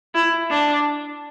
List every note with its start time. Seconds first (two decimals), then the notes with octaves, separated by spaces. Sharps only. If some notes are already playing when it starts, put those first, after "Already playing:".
0.15 E4
0.50 D4